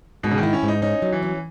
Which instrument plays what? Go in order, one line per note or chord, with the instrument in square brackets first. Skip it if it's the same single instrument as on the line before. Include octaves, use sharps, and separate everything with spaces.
[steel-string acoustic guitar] G#2 [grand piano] B2
[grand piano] C#3
D#3
[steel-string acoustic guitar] E4
[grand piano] C#4
[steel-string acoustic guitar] G#2
[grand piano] D#4
[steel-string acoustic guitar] C#4 [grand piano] D#4
[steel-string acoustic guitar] F#3
[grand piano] E3
[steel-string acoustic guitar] C#4